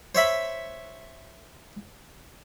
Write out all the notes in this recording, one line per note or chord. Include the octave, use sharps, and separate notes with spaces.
C5 C#5 E5 B5